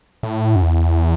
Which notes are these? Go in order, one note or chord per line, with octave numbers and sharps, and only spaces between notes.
A2
F#2
E2